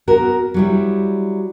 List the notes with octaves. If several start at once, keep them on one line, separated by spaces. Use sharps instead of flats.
B3 F#4 A#4
F#3 G3 E4